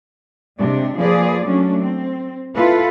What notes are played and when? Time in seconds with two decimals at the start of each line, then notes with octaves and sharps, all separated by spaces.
0.59 C3 G#3 D4
0.97 F3 A#3 G#4 B4 D5
1.45 F#3 A3 C#4 D4
1.79 C4
2.55 E4 F4 A4 B4